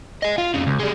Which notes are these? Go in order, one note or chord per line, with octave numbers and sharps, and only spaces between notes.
D#5 G#5
F4
F2 C#3
C#2
G3 G#3